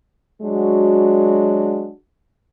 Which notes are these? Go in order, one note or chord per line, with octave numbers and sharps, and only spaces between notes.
F#3 G#3 D4 F#4